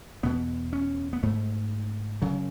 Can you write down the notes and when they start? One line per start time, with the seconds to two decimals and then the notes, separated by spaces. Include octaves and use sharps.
0.23 E2 B2 B3
0.73 C#4
1.13 B3
1.23 G#2 A3
2.22 F#2 C#3 F#3